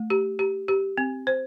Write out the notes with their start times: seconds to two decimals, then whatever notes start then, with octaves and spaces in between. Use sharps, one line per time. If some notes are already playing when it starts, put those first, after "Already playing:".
Already playing: A3
0.10 G4
0.39 G4
0.68 G4
0.98 C4
1.27 C5